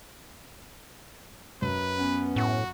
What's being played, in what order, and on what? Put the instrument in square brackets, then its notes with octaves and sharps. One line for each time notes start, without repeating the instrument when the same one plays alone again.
[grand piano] F#2 [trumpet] B4
[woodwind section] B3 C#4
[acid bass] A2 [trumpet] F#4